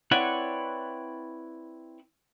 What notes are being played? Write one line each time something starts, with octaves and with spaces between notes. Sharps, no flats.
C4 E4 B4 C#5 D5 F#5